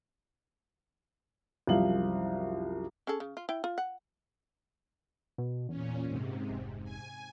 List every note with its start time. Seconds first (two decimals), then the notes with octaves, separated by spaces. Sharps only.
1.67 C2 F#2 F3 E4 F5 F#7
3.07 C#4 G#4 A4
3.20 C#3
3.37 F4
3.49 E4 G5
3.64 F4
3.78 F#5
5.38 B2
5.69 E2 A#2 C#4
6.05 G#2 C3
6.50 F1
6.84 G#5